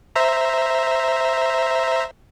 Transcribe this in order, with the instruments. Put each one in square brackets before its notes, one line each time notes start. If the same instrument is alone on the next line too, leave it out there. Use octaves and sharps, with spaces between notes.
[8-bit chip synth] C5 E5 A#5